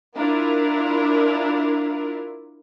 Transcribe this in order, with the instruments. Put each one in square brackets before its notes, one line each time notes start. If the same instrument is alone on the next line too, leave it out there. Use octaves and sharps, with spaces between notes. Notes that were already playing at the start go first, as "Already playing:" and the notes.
[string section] D4 E4 F4 A#4